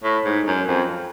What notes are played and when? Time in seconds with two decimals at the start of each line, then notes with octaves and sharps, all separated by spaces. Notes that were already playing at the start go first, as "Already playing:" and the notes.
0.04 A2
0.25 G#2
0.47 F#2
0.67 F2